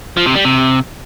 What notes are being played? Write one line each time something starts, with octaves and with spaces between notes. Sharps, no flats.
F3
C3
G3
C3